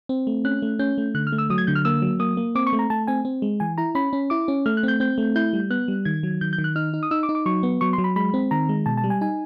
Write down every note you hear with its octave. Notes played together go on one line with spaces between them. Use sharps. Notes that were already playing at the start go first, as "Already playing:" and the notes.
C4
A3
C#4 F#6
A3
C#4 G6
A3
D3 F#6
F6
A3
E6
F#3 D#6
G#6
D3 G6
F6
A#3 E6
F#3
A#3 D#6
A#3
C4 D6
C#6
A3
A#5
A3 A5
C4 G#5
C4
G#3
E3 G#5
E4 A#5
C#4 B5
C#4
E4 D6
C#4
A3 F6
F#6
C4 G6
C4 G6
A3
E4 G6
G3
B3 F#6
G3
D#3 G#6
F#3
D#3 G6
G6
D#3
F#6
D#4 F6
D#4
D#6
D#4 E6
D6
D#4
D6
F#3 C#6
B3
F#3 C#6
C6
F#3
B5
G#3 B5
C4
D#3 A#5
G#3
B2 A5
A5
G3
G#5
D#4 G#5